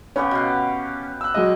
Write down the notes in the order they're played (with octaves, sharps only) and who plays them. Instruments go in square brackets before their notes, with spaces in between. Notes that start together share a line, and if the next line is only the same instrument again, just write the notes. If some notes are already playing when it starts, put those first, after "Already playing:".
[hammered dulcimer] C#3 B3 G4 [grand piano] C#4
[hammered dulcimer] B2 F5
[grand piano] E6 F#6
F#3 G#3 D#5